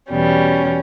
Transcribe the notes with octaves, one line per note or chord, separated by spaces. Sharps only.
E2 B2 G3 C#4